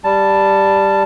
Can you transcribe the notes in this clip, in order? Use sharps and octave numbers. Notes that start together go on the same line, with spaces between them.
G3 A5